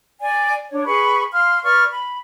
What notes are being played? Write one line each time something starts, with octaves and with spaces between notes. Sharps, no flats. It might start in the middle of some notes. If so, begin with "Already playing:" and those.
D5 G#5
D4 C#5
G#4 B4 B5 C#6
F5 C6 F6
B4 D5 C#6 F6
B5